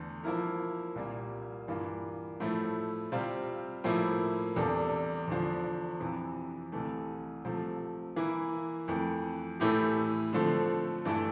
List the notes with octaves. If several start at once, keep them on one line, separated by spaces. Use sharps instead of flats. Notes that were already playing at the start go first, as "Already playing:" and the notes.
Already playing: E2 D3 A3
F3 A#3 E4 A#4
C2 A#2 G3 A#3
G2 E3 A#3 F4
A2 F3 A3 E4
C3 G3 C4 F4
A2 F3 A#3 E4
E2 C3 G3 D4 A4
E2 D3 F3
F2 C3 E3
C2 C3 E3 A3
C3 F3 A3
E3 A#3 E4
F2 E3 A3
A2 E3 A3 E4 G4
D3 F3 A3 C4
G2 E3 A3 E4 A4